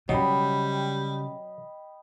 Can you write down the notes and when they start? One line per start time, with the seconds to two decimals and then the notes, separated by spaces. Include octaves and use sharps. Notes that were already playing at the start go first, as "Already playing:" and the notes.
0.09 C#3 F#3 G3 D#5 G5 B5